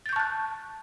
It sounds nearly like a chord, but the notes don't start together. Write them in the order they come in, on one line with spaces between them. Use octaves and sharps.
A6 G6 C#6 A5 F#6